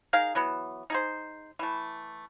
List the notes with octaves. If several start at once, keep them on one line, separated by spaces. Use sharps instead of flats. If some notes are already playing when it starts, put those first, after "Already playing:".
D#4 G#4 A#4 F5
E3 F#3 B3
D#4 G#4 C5
E3 A3